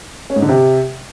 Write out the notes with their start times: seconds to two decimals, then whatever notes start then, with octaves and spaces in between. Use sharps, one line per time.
0.30 C#4
0.36 G#2
0.42 D3
0.49 C3